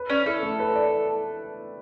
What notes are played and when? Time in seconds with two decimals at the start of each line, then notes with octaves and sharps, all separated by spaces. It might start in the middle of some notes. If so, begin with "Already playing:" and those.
Already playing: B4
0.10 C#4 D5
0.26 E4 A4
0.43 A3
0.60 B4
0.76 D5